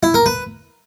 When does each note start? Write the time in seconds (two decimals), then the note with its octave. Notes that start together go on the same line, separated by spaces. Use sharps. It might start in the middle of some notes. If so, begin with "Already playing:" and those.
0.03 E4
0.14 A#4
0.26 B4